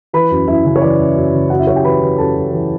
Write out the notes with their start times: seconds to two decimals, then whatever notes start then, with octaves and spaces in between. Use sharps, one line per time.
0.13 E3 B4 B5
0.31 F#2
0.48 F#2 E4 E5
0.65 C#3
0.76 C#5
0.82 E3 D5
0.99 F#2
1.16 F#2
1.33 C#3
1.50 F#2 F#4 F#5
1.58 E4 E5
1.67 F#2 C#5
1.76 G4 G5
1.84 E3 B4 B5
2.01 E3
2.18 F#2 A4 A5
2.35 F#2
2.52 E3